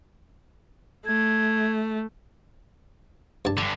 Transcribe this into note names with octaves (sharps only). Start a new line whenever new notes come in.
A3 G#6
G2 A5
G2 D3 A5